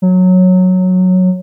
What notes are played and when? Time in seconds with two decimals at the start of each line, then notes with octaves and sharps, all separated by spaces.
0.02 F#3